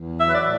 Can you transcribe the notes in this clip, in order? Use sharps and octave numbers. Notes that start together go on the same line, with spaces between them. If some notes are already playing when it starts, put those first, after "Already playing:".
Already playing: E2
F#3 E5
B4
D5
A2